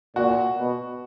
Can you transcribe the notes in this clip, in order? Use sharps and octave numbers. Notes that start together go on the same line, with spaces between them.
A#2 F#4
B2